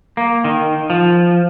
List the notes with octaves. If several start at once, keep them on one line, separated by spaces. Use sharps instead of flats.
A#3
D#3
F3